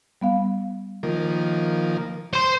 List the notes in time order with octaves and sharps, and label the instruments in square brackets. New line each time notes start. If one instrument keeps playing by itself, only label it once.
[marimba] G3 B3 F5
[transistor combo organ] D#3 F3 A#3
[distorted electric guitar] C5 C6